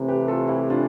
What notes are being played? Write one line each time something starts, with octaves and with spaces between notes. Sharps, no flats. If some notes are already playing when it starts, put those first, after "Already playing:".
Already playing: C3 E3 A3
G4 B4
F4 A4
E4 G4
D4 F4